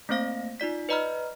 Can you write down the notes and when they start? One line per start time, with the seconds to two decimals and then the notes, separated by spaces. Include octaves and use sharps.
0.09 A3 A#3 C4 C5 F5 A#6
0.60 D#4 F4 D5 B6
0.89 B4 D5 D#5 A#5 B5 F6